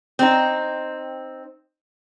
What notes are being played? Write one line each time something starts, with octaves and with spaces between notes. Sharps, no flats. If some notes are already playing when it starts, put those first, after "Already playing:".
C4 D#4